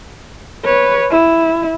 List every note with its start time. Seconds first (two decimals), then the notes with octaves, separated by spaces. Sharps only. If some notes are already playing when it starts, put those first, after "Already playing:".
0.65 B4 C#5
1.10 E4